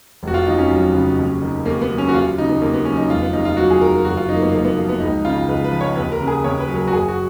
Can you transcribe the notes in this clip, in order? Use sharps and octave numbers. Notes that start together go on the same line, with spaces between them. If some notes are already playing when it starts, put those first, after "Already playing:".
F1 F#4
F4
D#2 D#4
C#4
F#3
C#3
D#2
D#3
D#2 A#3
B3
F#3
C#4
F#4
D#2 F4
F4
C#3 D#4
B3
D#2 A#3
B3
F#3 C#4
D#4
F1 F4
B3
D#2 D#4
F4
F#3 F#4
G#4
D#3 A#4
F#1 F#4
F4
F#2 D#4
A#3
B3
F#1 A#3
B3
F3 A#3
B3
C#2 D#4
C#3 F4
C#2 B4
B4
F3
C#5
D#2 B4
A#4
C#3
G#4
D#2 C#5
B4
F#3
A#4
F#4
F#1 G#4
F#4